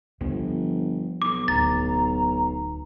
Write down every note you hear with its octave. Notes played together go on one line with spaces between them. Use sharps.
G1 F3 G3
B1 D6
D1 A#5 A6